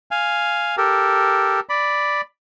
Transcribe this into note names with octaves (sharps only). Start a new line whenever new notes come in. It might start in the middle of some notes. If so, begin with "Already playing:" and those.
F5 G#5
G4 A4 A#4
D5 B5